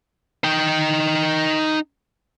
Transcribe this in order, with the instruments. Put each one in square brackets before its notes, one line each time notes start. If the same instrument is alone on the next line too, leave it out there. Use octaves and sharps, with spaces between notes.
[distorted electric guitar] D#4 G5